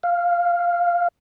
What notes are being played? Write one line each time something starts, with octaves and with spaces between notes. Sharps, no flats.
F5